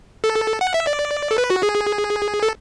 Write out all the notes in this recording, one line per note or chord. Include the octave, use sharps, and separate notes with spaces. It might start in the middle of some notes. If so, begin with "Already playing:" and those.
A4
F#5
E5
D5
A4
B4
F#4
G#4
A4